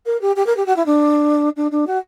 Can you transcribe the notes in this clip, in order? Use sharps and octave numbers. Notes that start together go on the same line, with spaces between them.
A#4
G4
G4
A#4
G4
F#4
E4
D4
D4
D4
F#4